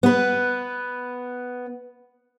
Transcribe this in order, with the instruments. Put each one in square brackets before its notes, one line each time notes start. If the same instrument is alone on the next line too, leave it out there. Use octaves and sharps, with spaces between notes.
[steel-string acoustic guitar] B3 B4